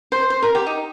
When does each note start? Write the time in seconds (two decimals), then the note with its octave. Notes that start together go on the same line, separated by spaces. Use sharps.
0.12 C5
0.30 C5
0.42 A#4
0.55 G4
0.67 D#4